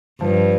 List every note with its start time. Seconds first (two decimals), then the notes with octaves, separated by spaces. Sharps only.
0.21 G2 F3